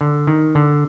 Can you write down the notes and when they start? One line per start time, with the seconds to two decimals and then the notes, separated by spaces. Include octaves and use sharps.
0.01 D3
0.27 D#3
0.55 D3